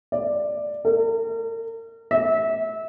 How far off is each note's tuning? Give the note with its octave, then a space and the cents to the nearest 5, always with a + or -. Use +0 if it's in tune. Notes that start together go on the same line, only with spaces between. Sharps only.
D5 +10
A#4 -40
E5 -25